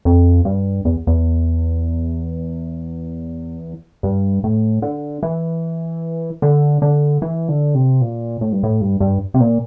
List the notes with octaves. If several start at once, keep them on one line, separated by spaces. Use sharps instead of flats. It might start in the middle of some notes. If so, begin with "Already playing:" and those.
F2
G2
E2
E2
G2
A2
D3
E3
D3
D3
E3
D3
C3
A#2
A2
G2
A2
G2
G2
C3
A#2